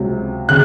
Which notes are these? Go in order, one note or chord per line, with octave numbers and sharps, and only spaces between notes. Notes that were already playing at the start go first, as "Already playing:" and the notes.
Already playing: C#2 C3 F#3
C#3 F#6